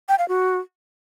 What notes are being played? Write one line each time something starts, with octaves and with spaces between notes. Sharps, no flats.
G5
F5
F#4